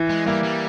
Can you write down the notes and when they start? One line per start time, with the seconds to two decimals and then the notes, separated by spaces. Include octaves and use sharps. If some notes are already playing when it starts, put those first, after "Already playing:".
Already playing: E3
0.10 G#3
0.26 G3 A#3 E4
0.44 G3